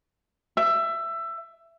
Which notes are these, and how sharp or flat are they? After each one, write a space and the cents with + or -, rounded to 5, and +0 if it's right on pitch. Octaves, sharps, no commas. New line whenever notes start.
E5 +20